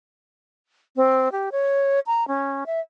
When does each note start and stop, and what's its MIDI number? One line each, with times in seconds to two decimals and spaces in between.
0.96 1.32 60
1.32 1.49 67
1.52 2.00 73
2.07 2.27 82
2.28 2.64 61
2.66 2.80 76